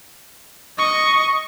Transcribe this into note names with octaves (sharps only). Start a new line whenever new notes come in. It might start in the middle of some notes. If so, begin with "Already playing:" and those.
D#5 C#6